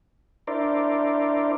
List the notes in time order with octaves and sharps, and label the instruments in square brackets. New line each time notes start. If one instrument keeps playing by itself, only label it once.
[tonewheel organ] D4 E4 A#4 C5 D5